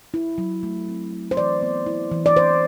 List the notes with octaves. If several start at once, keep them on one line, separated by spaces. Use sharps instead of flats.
E4
F#3
A3
C4
E4
C5
E3 D5
B3
E4
E3
D5
E3 C5